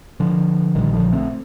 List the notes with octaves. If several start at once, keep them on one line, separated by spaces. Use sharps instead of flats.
D3 F3
A#1 A#2 D#3 G3
D3 F3
A3 C4